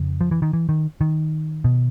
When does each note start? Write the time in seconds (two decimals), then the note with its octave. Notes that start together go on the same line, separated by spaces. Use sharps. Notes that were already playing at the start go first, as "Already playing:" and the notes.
Already playing: F2 C#3
0.21 F3
0.31 E3
0.42 D#3
0.53 E3
0.69 D#3
1.01 D#3
1.64 B2